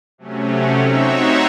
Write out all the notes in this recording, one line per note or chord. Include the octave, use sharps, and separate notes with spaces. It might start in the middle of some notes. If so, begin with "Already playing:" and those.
C3 F#3 A3 C#4
C4 D#4 F#4 C#5 E5